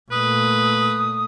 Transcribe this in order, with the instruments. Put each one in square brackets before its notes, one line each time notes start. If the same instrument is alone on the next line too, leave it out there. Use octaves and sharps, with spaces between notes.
[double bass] A#2 A3 [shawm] B4 [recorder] D#6